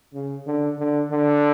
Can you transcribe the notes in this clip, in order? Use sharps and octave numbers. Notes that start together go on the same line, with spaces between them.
C#3
D3
D3
D3